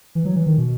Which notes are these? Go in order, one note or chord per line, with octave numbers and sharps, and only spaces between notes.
E3
F#3
E3
D#3
B2